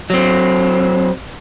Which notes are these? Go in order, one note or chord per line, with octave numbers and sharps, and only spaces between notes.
F#3 C4